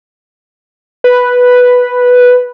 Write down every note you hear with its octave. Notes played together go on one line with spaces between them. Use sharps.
B4